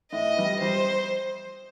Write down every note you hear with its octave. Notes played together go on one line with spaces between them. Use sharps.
A2 D#5
G3 B3
G3 C5